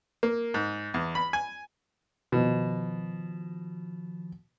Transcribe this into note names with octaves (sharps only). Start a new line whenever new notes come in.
A#3
G#2
E2
B5
G#5
B2 D#3 F3